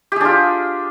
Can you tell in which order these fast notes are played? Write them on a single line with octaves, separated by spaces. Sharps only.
G4 G#4 D4 F4